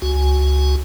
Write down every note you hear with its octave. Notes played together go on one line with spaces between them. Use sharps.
C#2 F#4 G#5